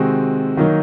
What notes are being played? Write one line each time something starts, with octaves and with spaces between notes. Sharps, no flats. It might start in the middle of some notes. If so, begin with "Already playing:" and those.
Already playing: C3 D#3 G#3 C4 F#4
D#3 F#3 A#3 D#4